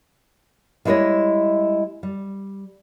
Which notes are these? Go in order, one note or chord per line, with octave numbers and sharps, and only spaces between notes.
G3 G#3 E4 C5 C#5 D#5
G3